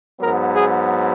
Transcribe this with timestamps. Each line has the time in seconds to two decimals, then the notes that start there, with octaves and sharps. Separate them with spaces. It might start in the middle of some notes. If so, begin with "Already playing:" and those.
0.20 G#2 F#3 B3 A#4
0.54 G#4